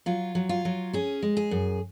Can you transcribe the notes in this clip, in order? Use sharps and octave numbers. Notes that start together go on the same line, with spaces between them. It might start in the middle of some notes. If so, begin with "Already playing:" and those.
F#3 F4
F#3
F4
F#3
C#4 G#4
G#3
G#4
F#2